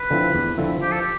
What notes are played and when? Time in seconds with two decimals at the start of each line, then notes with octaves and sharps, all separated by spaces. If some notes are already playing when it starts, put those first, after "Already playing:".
Already playing: B4
0.11 D3 F3 C4 E4
0.35 E2
0.58 D3 F3 C4 E4
0.81 F3 G4
0.91 A4
1.00 G4